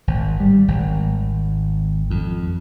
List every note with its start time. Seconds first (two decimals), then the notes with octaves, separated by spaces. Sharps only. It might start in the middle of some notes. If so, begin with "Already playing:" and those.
0.07 G#1
0.40 G3
0.68 G#1
2.10 F2